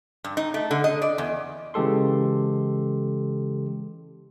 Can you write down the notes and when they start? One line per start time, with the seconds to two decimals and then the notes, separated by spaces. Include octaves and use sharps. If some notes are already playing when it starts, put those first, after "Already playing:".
0.24 G2
0.37 D#4
0.54 A3
0.71 D3
0.84 D#5
1.02 D5
1.18 E2
1.74 C#3 E3 G#3 G4 A4 C6